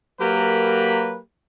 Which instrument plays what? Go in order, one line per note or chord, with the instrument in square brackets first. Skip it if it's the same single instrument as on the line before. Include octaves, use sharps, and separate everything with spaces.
[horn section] F#3 A#3 G4 A#4 B4 B5